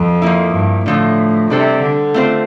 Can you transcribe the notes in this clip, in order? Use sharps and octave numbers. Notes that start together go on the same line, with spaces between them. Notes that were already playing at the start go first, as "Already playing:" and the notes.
Already playing: F2
F3 A#3 E4
G2
A2 D3 F3 A3
C3 G3 D4 A4 C5
D3
A3 C4 F4 C5